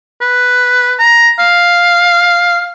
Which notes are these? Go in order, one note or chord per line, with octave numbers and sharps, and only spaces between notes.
B4
A#5
F5